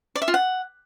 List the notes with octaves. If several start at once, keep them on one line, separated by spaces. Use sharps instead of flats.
D5
E5
F4
F#5